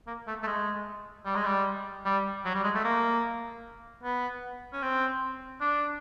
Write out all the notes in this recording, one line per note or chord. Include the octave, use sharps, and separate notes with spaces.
A#3
A3
A3
G#3
G3
G#3
G3
G3
F#3
G3
G#3
A3
A#3
B3
C#4
C4
D4